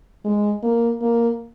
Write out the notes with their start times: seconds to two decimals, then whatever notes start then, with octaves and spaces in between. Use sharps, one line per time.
0.25 G#3
0.63 A#3
1.01 A#3